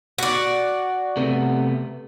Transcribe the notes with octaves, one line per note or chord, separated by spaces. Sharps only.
F#4 D5
C3 A3 B3